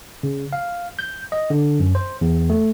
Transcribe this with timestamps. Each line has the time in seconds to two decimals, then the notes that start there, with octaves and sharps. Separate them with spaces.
0.23 C#3
0.53 F5
0.99 G6
1.32 D#5
1.50 D3
1.80 F#2
1.95 C5
2.21 E2
2.50 A3